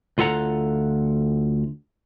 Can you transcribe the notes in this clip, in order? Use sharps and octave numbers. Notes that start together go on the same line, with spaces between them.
D2 F4 A4 F#5 A#5